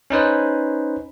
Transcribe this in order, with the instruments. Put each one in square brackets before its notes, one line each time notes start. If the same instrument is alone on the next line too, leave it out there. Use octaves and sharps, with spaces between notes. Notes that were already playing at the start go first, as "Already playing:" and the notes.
[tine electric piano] C#4 D#4 B4 C5